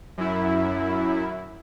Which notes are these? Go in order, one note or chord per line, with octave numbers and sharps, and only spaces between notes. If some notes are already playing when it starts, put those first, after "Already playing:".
F#2 E4